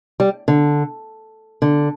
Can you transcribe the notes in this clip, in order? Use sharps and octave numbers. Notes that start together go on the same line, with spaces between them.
G3
D3
D3